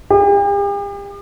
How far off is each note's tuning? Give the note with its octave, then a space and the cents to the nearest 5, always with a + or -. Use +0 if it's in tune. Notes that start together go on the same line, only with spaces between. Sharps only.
G4 +45